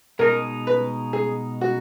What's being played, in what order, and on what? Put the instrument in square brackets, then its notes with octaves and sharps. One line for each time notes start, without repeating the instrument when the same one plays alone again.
[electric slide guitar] B2 G#3 D#4 [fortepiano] A#4
[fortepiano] B4
G#4
F#4